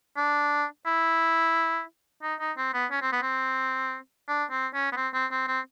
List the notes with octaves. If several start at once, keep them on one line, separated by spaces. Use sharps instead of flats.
D4
E4
D#4
D#4
C4
B3
C#4
C4
B3
C4
D4
C4
C#4
B3
C4
C4
C4
C4